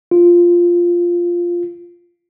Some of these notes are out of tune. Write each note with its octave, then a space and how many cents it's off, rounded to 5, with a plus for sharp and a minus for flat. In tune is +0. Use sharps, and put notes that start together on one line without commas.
F4 -5